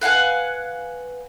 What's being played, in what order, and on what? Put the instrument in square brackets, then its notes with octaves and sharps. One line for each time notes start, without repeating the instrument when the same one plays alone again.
[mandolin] B4 F5 F#5 G#5